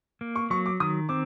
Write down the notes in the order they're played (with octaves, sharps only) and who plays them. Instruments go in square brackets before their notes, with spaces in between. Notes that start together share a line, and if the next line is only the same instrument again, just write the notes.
[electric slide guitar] A#3
[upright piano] C#6
[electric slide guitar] F#3 [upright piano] C#6
[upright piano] D6
[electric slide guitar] D#3 [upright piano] D#6
[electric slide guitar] C4 [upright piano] D6